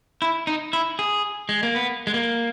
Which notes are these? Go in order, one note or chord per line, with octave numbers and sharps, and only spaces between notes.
E4
D#4
E4
G#4
G#3
A#3
B3
G#3
A#3